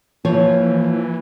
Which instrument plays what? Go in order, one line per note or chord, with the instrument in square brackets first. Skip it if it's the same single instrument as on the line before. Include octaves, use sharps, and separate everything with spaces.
[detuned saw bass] E3 [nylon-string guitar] F3 C#5 [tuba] A#3